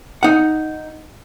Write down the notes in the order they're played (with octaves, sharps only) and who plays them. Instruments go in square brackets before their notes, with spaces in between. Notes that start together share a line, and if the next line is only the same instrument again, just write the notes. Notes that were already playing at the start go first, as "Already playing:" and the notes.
[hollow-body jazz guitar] D#4 F#5